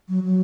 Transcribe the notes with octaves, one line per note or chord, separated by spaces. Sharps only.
F#3
F#3